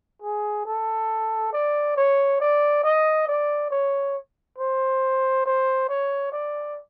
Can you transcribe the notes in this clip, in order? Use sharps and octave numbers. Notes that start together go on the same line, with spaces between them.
G#4
A4
D5
C#5
D5
D#5
D5
C#5
C5
C5
C#5
D5